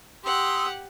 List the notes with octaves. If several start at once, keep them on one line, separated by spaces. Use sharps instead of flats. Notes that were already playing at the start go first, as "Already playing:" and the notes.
G4 F#5 C6 D#6 E6